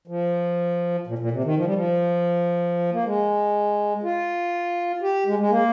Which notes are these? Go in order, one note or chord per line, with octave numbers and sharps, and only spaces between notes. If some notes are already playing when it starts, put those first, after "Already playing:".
F3
A#2
A#2
C3
D#3
F3
G3
F3
A#3
G#3
F4
G4
G#3
G#3
A#3